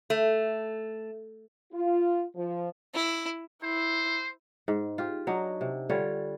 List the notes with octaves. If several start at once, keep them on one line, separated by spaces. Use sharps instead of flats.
A3
F4
F3
E4
E4 C5
G#2
F4 G4
F#3 D4 D#4
C3
D3 G3 F4 C#5